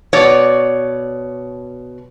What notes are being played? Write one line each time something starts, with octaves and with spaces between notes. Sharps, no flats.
B2 C#5 D5